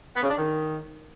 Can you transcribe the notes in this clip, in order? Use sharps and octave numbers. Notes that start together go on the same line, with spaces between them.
B3
C#3
D4
D#3